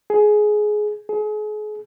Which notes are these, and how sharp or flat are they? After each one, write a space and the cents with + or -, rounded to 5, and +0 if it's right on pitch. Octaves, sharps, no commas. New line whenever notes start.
G#4 +15
G#4 +35